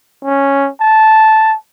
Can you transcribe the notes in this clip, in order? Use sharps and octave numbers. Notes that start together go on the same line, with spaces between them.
C#4
A5